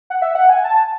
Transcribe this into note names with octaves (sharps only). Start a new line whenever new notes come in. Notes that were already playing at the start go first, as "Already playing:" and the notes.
F#5
E5
F#5
G#5
A5